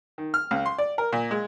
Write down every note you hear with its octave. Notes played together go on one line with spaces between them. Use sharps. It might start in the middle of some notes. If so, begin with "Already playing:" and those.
D#3
F6
C#2
C6
D5
A#4
A#2
G#3